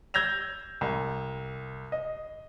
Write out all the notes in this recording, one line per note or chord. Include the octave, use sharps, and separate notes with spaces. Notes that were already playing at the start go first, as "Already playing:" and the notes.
E6 G6 G#6 A#6 F7
C2
D#5